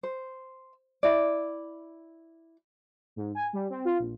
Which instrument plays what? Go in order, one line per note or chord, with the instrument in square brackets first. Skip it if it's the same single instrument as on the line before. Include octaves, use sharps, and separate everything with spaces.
[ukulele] C5
E4 D5
[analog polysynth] G#2
G#5
G3
C4
F4
A#1